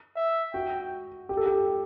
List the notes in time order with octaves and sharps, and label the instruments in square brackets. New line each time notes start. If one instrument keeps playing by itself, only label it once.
[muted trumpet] E5
[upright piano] F#4 [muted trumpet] G5
[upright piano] G4
A4
G4